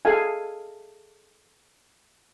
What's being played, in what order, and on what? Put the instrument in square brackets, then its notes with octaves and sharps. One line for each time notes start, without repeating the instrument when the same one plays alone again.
[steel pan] G#4 A4 F5 G#5